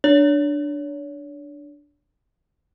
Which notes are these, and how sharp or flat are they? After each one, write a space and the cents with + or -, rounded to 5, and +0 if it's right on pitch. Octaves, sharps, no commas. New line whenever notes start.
D4 +0 C#5 +35